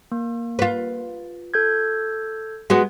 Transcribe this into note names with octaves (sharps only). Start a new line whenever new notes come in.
A#3
F4 B4
A4 G6 G#6
G#3 B3 F#4